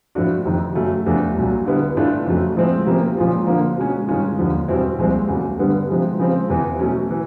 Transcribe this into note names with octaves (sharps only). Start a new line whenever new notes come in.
A2 F3 A3 D4 F#4
F2 C3 D#3
F#2 C#3 F#3 A3
E2 C3 F3 A3 D4
C2 A#2 F#3
D3 G3 B3 E4
A2 E3 A3 D4 F4
F2 C#3 F#3 A3
A2 F3 G#3 C4
C3 F3 A#3 C#4
A#2 F3 G#3 C#4 F4
D3 F3 A#3
B2 G#3 C#4
G2 D#3 G#3 C#4 F4
D#2 D3 F3
E2 B2 G3 C4 E4
C2 A#2 F3 G#3 C4
E2 C#3 F#3 A3
G2 D3 G3 B3
C3 F3 G#3
C#3 F3 G#3 C4
E2 C3 E3
B2 F#3 A3 C#4
E3